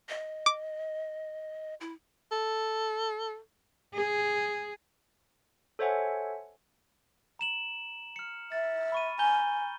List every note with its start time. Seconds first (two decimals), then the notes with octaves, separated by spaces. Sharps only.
0.09 D#5
0.46 D6
1.81 E4
2.32 A4
3.94 G#4
5.79 A4 C5 C#5 E5 F#5 G#5
7.39 A#5 E7 F#7
8.16 F6 C#7
8.52 E5 A6
8.92 B5 C#6 D#7
9.19 G#5 A#5 G6 G7